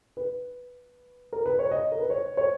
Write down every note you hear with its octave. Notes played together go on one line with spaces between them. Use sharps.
B4
A#4
B4
C#5
D#5
A#4
B4
C#5
C#5